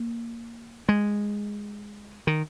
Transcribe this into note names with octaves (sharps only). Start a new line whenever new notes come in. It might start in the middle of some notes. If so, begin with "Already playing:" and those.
Already playing: A#3
G#3
D#3